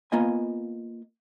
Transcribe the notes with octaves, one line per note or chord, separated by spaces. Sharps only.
A#3 B3 F4 D#5 G#5